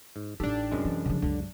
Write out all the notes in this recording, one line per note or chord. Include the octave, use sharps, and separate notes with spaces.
G#2
A1 D4 D#4 G4 A4
C2 F#2 G#3
E3
C#3 F3
C#2 F#2 D3